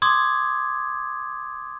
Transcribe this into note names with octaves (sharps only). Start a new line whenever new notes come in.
C6 D6 D#6 G#6